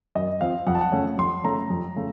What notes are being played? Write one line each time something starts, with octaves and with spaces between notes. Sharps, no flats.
F#2 D#5
F3 C4 F5
F2 F#5
A5
F#5
C#3 A3 C#4
F2 C6
C#3 A3 C#4 A#5
F2
C#3 A3